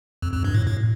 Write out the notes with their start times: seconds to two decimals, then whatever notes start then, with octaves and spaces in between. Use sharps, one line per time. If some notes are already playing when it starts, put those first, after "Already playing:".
0.22 F2
0.33 F2
0.44 G2
0.54 A2
0.66 A2